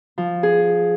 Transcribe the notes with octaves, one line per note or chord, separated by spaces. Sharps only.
F3
G#4